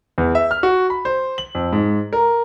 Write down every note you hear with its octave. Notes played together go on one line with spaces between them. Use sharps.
E2
E5
F6
F#4
B5
C5
F#7
F2
G#2
A#4